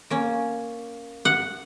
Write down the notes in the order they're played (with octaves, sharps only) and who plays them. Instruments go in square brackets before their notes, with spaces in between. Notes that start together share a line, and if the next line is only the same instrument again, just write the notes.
[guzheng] A#3 C#4
[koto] F#5